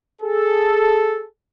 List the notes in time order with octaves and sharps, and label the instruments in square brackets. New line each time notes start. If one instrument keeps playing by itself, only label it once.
[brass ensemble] G#4 A4